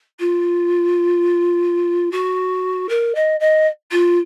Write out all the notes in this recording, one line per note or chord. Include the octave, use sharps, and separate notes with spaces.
F4
F#4
A#4
D#5
D#5
F4